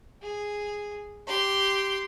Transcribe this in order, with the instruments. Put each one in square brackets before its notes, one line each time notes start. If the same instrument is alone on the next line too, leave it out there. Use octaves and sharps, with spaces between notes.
[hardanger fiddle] G#4
G4 C6